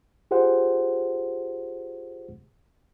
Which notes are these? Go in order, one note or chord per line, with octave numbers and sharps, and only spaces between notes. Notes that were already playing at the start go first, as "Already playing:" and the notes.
F4 G4 G#4 C5 F#5